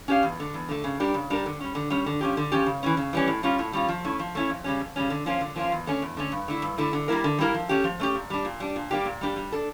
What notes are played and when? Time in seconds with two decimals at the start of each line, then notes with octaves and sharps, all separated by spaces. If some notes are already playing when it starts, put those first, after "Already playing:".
0.08 C#4 G4 C#5 F5
0.23 E2
0.39 D3 A3
0.54 E2
0.69 D3 A3
0.84 C#3
1.00 G3 D4 G4 A#4
1.14 C#3
1.30 G3 D4 G4 A#4
1.46 D3
1.60 G3 C#4
1.75 D3
1.90 G3 C#4
2.06 D3
2.21 F3 C#4 G4
2.37 D3
2.52 F3 C#4 G4
2.66 C#3
2.83 E3 G3 C#4
2.97 C#3
3.13 E3 G3 C#4
3.28 A2
3.43 G3 C#4 F4
3.59 A2
3.73 G3 C#4 F4
3.89 F3
4.04 A3 C#4 E4
4.19 F3
4.35 A3 C#4 E4
4.50 F2
4.64 C#3 G3 C#4
4.80 F2
4.96 C#3 G3 C#4
5.10 D3
5.26 F3 A#3 C#4 F4
5.41 D3
5.56 F3 A#3 C#4 F4
5.72 E2
5.87 D3 A3 C#4
6.02 E2
6.17 D3 A3 C#4
6.32 G2
6.48 D3 A3 E4
6.62 G2
6.78 D3 A3 E4
6.93 D3
7.08 G3 A#3 E4 A#4
7.24 D3
7.39 G3 A#3 E4 A#4
7.54 F3
7.69 A3 C#4 G4
7.84 F3
8.00 A3 C#4 G4
8.15 A#2
8.30 G3 D4
8.45 A#2
8.60 G3 D4
8.76 A#2
8.91 G3 A#3 D4 G4
9.06 A#2
9.21 G3 A#3 D4 G4
9.36 G3
9.52 D4 A4